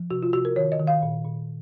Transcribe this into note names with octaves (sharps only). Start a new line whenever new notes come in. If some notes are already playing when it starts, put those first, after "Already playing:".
Already playing: F3
C3 F#4
F4
C3 F#4
A#4
D#3 C#5
D#5
D#3
F5
A#2
A#2